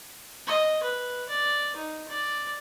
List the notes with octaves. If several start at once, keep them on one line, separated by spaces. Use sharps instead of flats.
D#5
B4
D5
D#4
D5